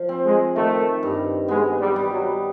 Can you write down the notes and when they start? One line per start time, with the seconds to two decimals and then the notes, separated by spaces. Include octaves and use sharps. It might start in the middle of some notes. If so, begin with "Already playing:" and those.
Already playing: F3
0.09 C4
0.24 G#3
0.56 D#3 A3
1.03 G2
1.48 G#3 B3
1.79 G3
1.96 G3
2.11 F#3